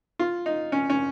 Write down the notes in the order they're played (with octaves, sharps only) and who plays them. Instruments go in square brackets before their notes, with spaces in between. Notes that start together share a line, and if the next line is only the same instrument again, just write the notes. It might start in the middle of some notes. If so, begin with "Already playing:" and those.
[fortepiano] F4
D#4
C#4
C#4